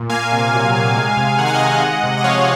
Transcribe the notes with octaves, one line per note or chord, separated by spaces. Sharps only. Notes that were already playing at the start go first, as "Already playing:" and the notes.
Already playing: A#2
A#3 F5 G#5
C3
F#3
C3
G#3
C3
D#3 F#5
G#5
D#5 F#5
C3
G#3
C3
D#5
F3 C#5 F5